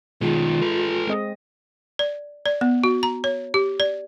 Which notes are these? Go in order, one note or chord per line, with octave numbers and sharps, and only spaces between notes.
B2 D#3 G#3 F4
A4 B4
G#3 C4 D#5
D5
D5
B3
F#4
A#5
C#5
G4
D5